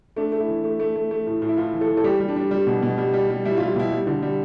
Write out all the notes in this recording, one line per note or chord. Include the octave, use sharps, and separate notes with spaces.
A3 D4
A3
E4
E3
A3
A3
A3
A3
A2
A2
E4
A2 F4
E3
A4
E3
A4
G3 G4
G3
D4
G3
G3
B2
B2
G3
G3
G3
G3 E4
F4
G3
F4
B2 E4
G3
D3
G3